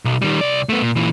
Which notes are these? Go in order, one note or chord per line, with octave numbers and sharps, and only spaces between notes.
B1
D#3 G3
C2 D5
A3 B3
A#2
A#2 E3